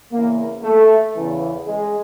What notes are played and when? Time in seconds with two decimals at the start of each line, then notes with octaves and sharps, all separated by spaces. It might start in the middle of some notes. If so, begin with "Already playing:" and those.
0.12 E2 C#3 E3 A#3
0.63 A3
1.16 E2 C#3 E3
1.67 G#3